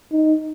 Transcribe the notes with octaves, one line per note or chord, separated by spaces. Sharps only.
D#4